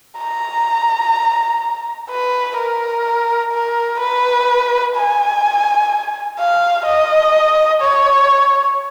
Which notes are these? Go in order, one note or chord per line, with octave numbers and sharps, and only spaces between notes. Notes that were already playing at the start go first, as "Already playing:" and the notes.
A#5
B4
A#4
A#4
B4
G#5
F5
D#5
C#5